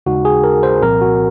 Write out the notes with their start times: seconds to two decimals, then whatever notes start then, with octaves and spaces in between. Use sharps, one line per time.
0.06 D#2 C#3 G#3 D#4 F#4
0.25 G#4
0.44 A#4
0.63 C5
0.82 C2 A#2 F3 C4 A#4
1.01 F#4